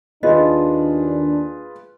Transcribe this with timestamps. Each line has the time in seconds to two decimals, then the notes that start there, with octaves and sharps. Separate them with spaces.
0.23 D#2 D4 F4 G#4 B4 D#5